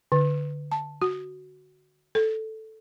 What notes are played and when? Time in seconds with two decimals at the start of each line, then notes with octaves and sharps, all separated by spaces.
0.12 D3
0.72 A5
1.02 F#4
2.15 A4